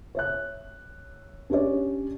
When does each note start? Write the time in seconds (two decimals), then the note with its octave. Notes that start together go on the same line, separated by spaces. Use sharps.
0.15 C#5 E5 F#6
1.50 C#4 D4 G4 C#5 D5